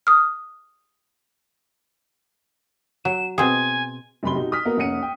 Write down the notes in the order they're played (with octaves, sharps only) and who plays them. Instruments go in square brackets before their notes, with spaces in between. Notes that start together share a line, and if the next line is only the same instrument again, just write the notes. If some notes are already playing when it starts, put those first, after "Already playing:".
[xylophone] D#6 F6
[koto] F#3 [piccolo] E7
[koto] B2 C4 G#4 [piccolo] G#5
[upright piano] F1 F#2 C3 B5 C6 G7
B2 D#4 G4
D#6 F6 B6
A#3 B3 F#4 A#4
F1 A#3 C#4 F#5 C#7 D#7
G5